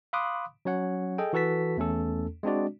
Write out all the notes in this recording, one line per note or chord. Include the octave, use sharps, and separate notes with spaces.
F5 B5 C6 D6 D#6 F#6
F#3 C#4 C#5 F#5
G#4 A4 D#5 G5
E3 F#4 A4 B4 A5 B6
E2 A3 C#4 A4
G#3 C4 D4 F#4 D5